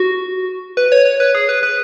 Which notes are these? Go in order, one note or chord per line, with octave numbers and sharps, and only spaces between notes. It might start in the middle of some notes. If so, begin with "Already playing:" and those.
Already playing: F#4
B4
C#5
C#5
B4
G#4
B4
B4